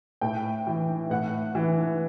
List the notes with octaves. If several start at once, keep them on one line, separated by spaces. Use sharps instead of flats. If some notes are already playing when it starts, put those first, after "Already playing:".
A2 G5
E3
A2 F#5
E3